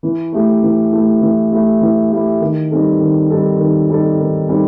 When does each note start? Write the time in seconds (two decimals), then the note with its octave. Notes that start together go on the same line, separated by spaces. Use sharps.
0.03 E3
0.32 A3 E4 G4
0.62 E3
0.93 A3 E4 G4
1.22 E3
1.52 A3 E4 G4
1.81 E3
2.11 A3 E4 G4
2.41 D#3
2.71 G3 C4 D#4 A4
3.00 D#3
3.30 G3 C4 D#4 A4
3.59 D#3
3.89 G3 C4 D#4 A4
4.19 D#3
4.49 G3 C4 D#4 A4